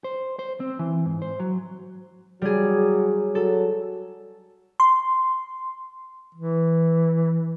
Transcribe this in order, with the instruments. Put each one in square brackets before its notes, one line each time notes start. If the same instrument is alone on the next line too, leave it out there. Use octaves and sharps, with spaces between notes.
[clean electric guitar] C5
C5
C4
E3
G#2
C5
F#3
[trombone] F#3 [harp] G3 G#4
[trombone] F#3 [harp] A4
[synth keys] C6
[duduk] E3